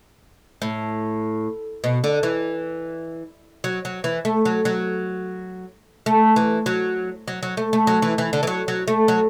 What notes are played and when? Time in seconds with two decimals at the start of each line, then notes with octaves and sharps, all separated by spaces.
0.62 A2
1.84 B2
2.04 D3
2.23 E3
3.64 F#3
3.85 F#3
4.04 E3
4.25 A3
4.45 F#3
4.65 F#3
6.06 A3
6.36 E3
6.66 F#3
7.28 F#3
7.43 F#3
7.57 A3
7.73 A3
7.87 F#3
8.02 E3
8.18 E3
8.33 D3
8.43 E3
8.47 F#3
8.68 F#3
8.88 A3
9.08 F#3